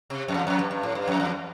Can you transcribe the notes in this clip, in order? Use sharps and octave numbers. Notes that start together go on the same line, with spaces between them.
C3
F2
E2
F2
G2
G2
A2
G2
F2
E2